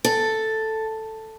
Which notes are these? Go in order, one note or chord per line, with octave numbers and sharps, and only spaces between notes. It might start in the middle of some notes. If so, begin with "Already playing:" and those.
A4